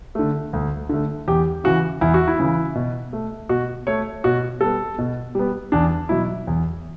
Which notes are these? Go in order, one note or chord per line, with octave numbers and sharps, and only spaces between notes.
D3 A3
D2
D3 A3
E2 G4
C#3 E3 F#4
E2 E4
F#4
E4
C#3 E3
B2
A3
B2 F#4
A3 C#5
B2 F#4
G3 B3 A4
B2
G3 B3
E2 D4
B2 F#3 E4
E2